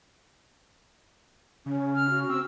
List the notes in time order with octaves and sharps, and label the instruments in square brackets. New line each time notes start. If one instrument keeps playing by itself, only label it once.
[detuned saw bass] C#3 [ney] C#4
[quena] F6
[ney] F#4
[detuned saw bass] C4 [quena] E6